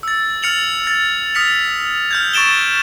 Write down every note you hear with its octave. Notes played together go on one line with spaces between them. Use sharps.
E6 A6
F6 A6 C#7 F7 F#7
A6
D#6 F6 B6 C#7 F7
F6 G6 G#6
C#6 A6 D7 E7 G7